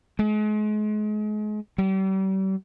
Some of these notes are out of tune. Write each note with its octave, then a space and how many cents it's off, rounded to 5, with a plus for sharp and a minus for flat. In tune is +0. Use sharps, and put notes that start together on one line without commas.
G#3 +35
G3 -40